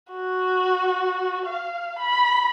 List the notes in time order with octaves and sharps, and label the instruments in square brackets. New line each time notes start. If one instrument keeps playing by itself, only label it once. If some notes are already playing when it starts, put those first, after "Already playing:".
[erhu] F#4
F5
B5